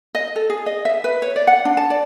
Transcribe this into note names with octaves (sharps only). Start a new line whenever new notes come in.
D#5
A4
G#4
D#5
E5
B4
C#5
D5
F#5
D4
A5
D5